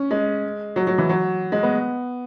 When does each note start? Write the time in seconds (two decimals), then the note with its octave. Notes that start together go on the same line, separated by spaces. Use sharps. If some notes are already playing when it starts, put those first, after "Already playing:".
Already playing: C#4
0.11 G#3
0.76 F#3
0.87 F#3
0.98 E3
1.09 F#3
1.52 G#3
1.63 B3